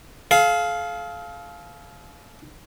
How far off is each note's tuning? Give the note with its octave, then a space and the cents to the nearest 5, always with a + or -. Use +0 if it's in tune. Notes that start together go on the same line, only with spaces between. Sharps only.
A4 -45 F5 +0